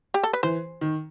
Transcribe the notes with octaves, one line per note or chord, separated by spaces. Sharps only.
G4
A4
B4
E3 C5
D#3